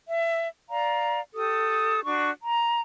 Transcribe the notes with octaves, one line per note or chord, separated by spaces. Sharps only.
E5
D5 F5 A#5
G4 A4 D#6
D4 F#4 C#6
A#5